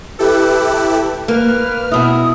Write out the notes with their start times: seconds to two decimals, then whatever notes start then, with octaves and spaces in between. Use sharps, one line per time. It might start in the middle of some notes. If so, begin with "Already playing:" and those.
0.19 E4 G4 A4 B4
1.28 A#3 B4 F6
1.92 B2 E4 D#6